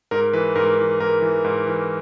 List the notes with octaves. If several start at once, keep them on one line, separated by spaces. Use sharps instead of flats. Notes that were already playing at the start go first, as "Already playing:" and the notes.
G#2 A#4
E3 B4
G#2 A#4
E3
G#2 A#4
E3
G#2
E3